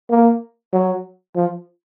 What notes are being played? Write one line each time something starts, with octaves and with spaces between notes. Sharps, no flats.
A#3
F#3
F3